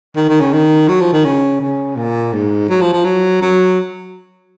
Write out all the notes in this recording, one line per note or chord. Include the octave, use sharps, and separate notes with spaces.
D#3
D#3
C#3
D#3
F#3
F3
D#3
C#3
C#3
A#2
G#2
F#3
F3
F3
F#3
F#3